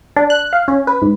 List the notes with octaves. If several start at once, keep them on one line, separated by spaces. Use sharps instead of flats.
D4
F#6
F5
C#4
B4
G#2